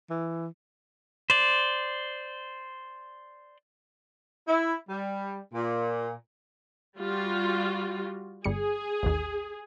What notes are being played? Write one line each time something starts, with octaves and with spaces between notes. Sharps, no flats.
E3
C5 D5
E4
G3
A#2
G3 F4 F#4
G1 G3 G#4 C#7
A1 D#2